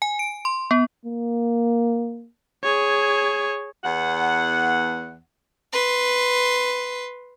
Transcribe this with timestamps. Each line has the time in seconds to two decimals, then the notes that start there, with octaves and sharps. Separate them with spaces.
0.02 G#5
0.19 D7
0.45 C6
0.71 B3
1.05 A#3
2.64 G#4 C#5
3.84 E2 F#5
5.73 B4 C6